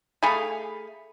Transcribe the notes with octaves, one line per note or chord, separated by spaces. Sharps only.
A3 G#4 F5 B5